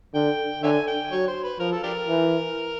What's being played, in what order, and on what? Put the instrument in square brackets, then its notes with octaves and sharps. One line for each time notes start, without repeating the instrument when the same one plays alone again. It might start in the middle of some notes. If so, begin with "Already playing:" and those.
[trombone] D3 [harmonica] G5
[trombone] D3 [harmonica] C#5 E5 G#5
[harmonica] G5
[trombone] F#3 [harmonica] C#5
[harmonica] C5
B4
[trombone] F3 [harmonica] A#4
[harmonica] A4
D4 G4 A#4
[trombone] E3